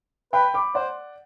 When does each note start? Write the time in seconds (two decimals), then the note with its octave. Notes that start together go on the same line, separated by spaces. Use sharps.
0.33 B4 G5 B5
0.54 B5 D6
0.75 C5 D5 F#5